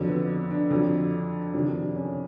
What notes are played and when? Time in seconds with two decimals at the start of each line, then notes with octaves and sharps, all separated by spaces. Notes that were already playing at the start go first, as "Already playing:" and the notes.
Already playing: F2 D3 F#3
0.09 B3
0.51 D4
0.71 F2 D3 F#3
1.54 F2 C3 D#3 F#3 D4
1.75 D4
1.96 C#4